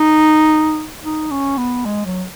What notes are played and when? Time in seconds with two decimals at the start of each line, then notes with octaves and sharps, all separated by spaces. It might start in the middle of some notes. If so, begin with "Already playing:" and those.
Already playing: D#4
1.04 D#4
1.31 C#4
1.58 B3
1.85 G#3
2.06 F#3